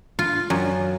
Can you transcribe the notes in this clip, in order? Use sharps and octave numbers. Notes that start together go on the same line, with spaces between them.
F4
F#2